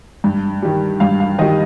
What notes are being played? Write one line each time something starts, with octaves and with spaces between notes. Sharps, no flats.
G2
D#3 G3
G2 F5
F5
D#3 G3 D#5